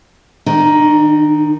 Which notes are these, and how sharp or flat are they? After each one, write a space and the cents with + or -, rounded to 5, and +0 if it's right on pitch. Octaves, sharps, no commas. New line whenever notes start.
D#3 +0 D4 +40